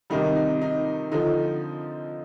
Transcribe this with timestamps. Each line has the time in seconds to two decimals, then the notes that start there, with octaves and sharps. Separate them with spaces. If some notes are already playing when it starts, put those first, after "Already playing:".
0.10 C3 D#3 G3 D#4
0.36 D#4
0.62 D#4
1.12 D3 F3 D#4